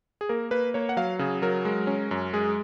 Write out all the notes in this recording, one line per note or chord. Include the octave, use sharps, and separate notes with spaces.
G#4
A#3 A#4
A#3 B4
A#3 C#5
F#5
F#3 F5
C#3 G#4
F#3 A#4
G#3
C#4
F#2
G#3 G#4